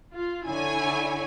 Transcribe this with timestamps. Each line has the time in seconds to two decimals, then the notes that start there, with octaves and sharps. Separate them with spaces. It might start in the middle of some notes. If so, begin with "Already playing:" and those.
0.14 F4
0.47 D3 E4 C#5 G#5